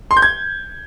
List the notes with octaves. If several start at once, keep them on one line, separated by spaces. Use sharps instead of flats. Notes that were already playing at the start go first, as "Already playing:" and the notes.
C6
G6
G#6